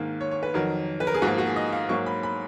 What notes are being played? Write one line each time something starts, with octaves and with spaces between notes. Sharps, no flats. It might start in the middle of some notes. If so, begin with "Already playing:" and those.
Already playing: G#2 D#3 A#3
C#5
C#5
B4
F2 D#3 F#3 A#4
B4
A#4
G#4
G#2 F3 A#3 F#4
F#4
G#4
D#5
F5
G#2 F#3 A#3 C#6
B5
B5